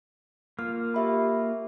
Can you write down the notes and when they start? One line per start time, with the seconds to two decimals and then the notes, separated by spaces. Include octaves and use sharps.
0.59 A#3 F4 F6
0.94 G4 E5 B5